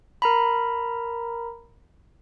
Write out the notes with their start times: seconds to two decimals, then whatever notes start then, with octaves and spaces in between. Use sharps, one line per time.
0.22 A#4 A#5 B5